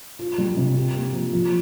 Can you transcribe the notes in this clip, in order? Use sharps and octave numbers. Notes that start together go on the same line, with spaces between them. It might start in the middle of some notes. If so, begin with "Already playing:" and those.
F4
G3
C3
G4
A#3
F3
F3